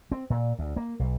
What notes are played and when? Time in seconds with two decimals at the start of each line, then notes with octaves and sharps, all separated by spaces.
0.12 C4
0.30 A#2
0.59 D2
0.76 A#3
0.99 B1